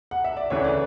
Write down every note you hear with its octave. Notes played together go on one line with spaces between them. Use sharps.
F#5
E5
D5
D2 C#3 E3 A3 D4 C#5
D5